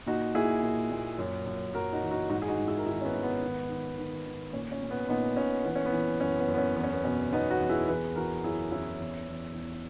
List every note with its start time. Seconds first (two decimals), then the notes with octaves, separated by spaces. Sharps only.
0.06 A#2 D#4 F#4
0.34 A#2 E4 G#4
0.63 A#2
0.91 A#2
1.19 F#2
1.46 F#2
1.74 F#2 F#4 A#4
1.93 D#4 F#4
2.03 E3
2.11 D#4 F#4
2.30 G#2 D#4 F#4
2.42 G#4
2.48 D#4 F#4
2.57 G#2
2.67 E4 G#4
2.78 A#4
2.85 D#3 E4 G#4
3.01 C#4
3.05 B3
3.13 G#2
3.23 B3
3.42 D#3
3.69 D#3
3.98 D#3
4.26 D#3
4.53 A#2 C#4
4.71 C#4
4.82 A#2
4.91 B3
5.09 A#2 B3 D#4
5.36 A#2 C#4
5.64 E3 B3
5.75 C#4
5.86 B3
5.93 E3
6.20 F#2 C#4
6.39 B3
6.48 F#2
6.54 B3
6.58 C#4
6.76 E2 B3
6.83 C#4
6.92 B3
7.04 B2 C#4
7.32 B2 B3 D#4
7.50 D#4 F#4
7.60 E2
7.70 E4 G#4
7.88 E3 G#4 B4
8.16 E3 F#4 A#4
8.44 F#2 E4 G#4
8.72 E3 C#4 E4
9.00 E2
9.28 E2
9.55 E2